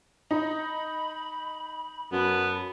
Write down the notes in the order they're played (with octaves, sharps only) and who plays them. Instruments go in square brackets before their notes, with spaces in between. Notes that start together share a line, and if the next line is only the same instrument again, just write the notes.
[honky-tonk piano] D#4 [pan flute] B5
[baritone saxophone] F#2 [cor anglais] B3 [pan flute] A5